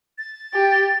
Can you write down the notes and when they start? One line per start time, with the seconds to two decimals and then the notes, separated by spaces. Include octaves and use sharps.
0.18 A6
0.54 G4